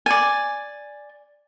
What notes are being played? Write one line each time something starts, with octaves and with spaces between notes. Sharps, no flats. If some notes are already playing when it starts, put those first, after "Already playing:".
D5 G#5